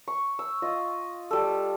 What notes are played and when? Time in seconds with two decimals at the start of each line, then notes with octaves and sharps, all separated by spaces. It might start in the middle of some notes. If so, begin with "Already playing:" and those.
0.08 C#6
0.39 E6
0.62 F4 D#5
1.31 G3 A4